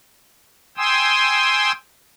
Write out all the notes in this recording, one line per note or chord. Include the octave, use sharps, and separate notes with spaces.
G5 G#5 C6 D#6 E6